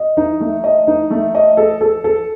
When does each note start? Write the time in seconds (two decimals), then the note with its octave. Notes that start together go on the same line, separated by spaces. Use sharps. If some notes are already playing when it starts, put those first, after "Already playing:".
Already playing: D#5
0.17 D#4
0.41 A3
0.64 D#5
0.87 D#4
1.10 A3
1.35 D#5
1.57 A4
1.81 A4
2.04 A4